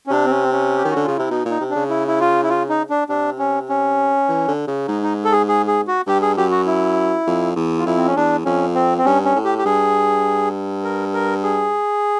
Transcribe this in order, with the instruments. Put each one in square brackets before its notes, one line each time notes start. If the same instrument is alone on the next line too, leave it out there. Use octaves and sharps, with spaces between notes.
[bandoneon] C#4
[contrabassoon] C3 [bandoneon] D4
[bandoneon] C4
C#4
C4
C#4
G4
[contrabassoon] D#3
[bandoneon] F#4
[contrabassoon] D3
[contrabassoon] C#3 [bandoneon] F4
[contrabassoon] C3 [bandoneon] E4
[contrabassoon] B2 [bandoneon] D#4
[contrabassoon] A#2 [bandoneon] D#4
[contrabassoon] C3
[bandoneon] D4
[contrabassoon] C#3
[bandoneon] E4
E4
F4
E4
F4
D#4
D4
[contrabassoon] C3 [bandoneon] D4
[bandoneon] C#4
C#4
[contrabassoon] E3
D3
C#3
[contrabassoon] G#2 [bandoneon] D#4
[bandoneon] D#4
A4
G#4
G#4
G#4
F#4
[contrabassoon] G2 [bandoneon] G4
[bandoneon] G#4
[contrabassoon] F#2 [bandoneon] G4
[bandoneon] F#4
E4
[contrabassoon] F2
E2
[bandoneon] F4
[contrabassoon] F2 [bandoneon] E4
[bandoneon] C4
C#4
[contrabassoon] E2 [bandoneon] D4
[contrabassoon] F2 [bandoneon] C#4
[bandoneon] C4
C4
[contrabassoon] G2 [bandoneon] C#4
[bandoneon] C#4
[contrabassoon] A2
[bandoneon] G4
G4
[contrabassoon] G2 [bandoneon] G#4
[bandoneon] A#4
A#4
G#4